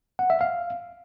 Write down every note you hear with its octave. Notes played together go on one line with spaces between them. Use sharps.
F#5
E5
F5